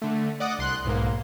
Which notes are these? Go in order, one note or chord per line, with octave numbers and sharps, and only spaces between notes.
D3 A3
D5 D#5 F#5 D6 D#6
C2 C6 F#6
B1 G#2 A#3